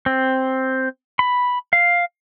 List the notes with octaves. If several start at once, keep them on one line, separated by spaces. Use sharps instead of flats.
C4
B5
F5